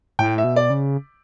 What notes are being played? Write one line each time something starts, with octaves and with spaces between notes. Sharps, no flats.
A2 G5
E5
B2
D5
C#3